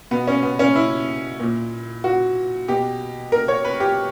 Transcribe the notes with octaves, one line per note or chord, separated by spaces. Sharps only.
B2 B3
C#4
B3
C#4
E4
A#2
F#4
B2 G4
A#4
C#5
B4
G4